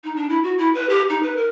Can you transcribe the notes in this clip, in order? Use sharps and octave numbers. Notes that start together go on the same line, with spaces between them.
D#4
D4
E4
F#4
E4
B4
G4
D#4
B4
A#4